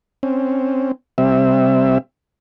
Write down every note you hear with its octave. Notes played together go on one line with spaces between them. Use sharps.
C4 C#4
C3 G3 C4 E5